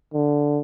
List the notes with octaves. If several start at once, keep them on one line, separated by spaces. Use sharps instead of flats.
D3